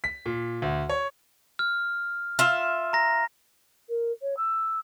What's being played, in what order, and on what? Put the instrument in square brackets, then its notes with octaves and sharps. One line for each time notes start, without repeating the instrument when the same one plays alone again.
[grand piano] B6
A#2
D2
C#5
[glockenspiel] F6
[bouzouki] F4 E5
[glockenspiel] A#5 A#6
[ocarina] A#4
C#5
E6